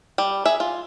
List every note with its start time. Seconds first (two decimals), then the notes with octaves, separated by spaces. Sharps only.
0.18 G3
0.45 G#4 E5
0.60 F4